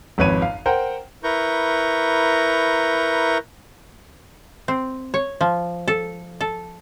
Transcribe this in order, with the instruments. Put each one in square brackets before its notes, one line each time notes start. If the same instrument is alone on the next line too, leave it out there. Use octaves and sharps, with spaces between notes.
[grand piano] G#1 F2 B4 C#5 D#7
F5
A#4 C5 F#5 G5
[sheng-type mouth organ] E4 A#4 B4 A#5 C#6 G6
[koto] C4
C#5
F3
A4
A4